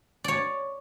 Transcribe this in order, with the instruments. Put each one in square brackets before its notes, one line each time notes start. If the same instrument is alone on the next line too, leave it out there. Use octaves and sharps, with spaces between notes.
[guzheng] C#5 D5